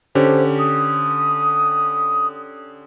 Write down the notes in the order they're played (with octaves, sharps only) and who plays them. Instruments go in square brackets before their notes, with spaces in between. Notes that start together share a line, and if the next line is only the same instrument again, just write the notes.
[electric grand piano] D3 C#4 G4 [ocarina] C5
[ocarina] D#6